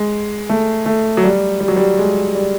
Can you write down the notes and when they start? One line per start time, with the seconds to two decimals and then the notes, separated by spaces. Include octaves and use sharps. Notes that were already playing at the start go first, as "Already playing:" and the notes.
Already playing: G#3
0.49 A3
0.86 A3
1.17 F#3
1.24 G3
1.60 G3
1.68 F#3
1.76 G3
1.98 G#3
2.35 G3